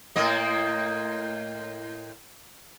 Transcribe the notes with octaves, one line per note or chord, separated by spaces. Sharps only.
A2 A#3 D#5